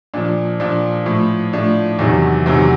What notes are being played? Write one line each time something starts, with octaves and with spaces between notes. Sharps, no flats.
A#2 F3 D4
A#2 F3 D4
A2 F3
A2 F3 D4
E2 C3 D#3 F#3
E2 C3 D#3 F#3